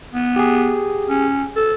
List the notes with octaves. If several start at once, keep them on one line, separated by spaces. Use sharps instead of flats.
B3
G4 G#4
C#4
A4